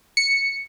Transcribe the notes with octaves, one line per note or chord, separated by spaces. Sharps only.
C#7